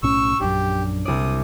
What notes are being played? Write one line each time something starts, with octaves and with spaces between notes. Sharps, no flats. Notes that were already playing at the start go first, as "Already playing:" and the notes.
B1 A2 C#4 C#6 E6
A#1 F#2 D4 G4
C2 D5 D#6